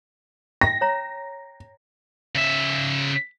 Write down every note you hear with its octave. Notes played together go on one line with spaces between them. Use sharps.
G5 A#6
C#5 A#5
C#3 E5